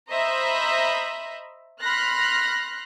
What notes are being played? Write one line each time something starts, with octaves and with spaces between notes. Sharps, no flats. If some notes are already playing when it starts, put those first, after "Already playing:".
C5 D#5 E5 A#5 B5
B5 C6 F6 F#6 A#6